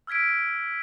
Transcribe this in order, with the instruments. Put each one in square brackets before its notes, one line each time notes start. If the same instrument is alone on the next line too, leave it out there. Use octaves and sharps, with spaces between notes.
[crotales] E6 F6 G#6 B6 D7